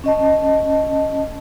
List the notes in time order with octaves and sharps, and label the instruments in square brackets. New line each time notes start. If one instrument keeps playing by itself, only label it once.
[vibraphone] C#4 D#5 A5